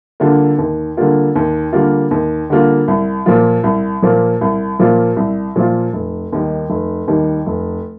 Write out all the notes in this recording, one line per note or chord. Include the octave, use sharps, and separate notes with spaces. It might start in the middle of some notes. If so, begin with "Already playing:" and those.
D3 G3 A#3 F4
D#2
D3 G3 A#3 F4
D#2
D3 G3 A#3 F4
D#2
D3 G3 A#3 F4
C2
A#2 F3 A#3 F4
C2
A#2 F3 A#3 F4
C2
A#2 F3 A#3 F4
C2
A#2 F3 A#3 F4
F1
D#2 D#3 G3
F1
D#2 D#3 G3
F1